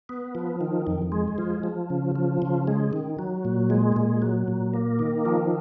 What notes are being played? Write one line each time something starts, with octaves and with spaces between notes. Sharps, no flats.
B3
F3
D#3
F2
G#3
F3
F3
C#3
F3
C#3
G#3
D#3
F#3
A#2
G#3
A#2
F#3
A#2
A#3
D#3
F3